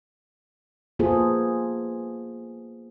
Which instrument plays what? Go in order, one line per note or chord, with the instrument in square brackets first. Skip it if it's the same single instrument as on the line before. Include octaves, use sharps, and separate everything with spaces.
[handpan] A#3 B3 F4 G#4 A4 C5